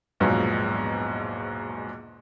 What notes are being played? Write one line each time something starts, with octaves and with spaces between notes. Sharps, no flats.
A#1 E2 G#2 B2 F3 F#3